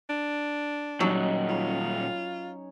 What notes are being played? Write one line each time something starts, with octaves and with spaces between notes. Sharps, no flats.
D4
A#2 F#3 G3 C#4 D#4
F4 C#5 B5